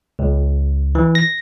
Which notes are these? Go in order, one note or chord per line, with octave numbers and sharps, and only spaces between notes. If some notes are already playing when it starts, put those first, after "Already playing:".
C#2
E3
A#6